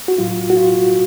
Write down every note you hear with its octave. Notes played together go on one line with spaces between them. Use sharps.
F#4
A2 F#3 F4
F#4
F4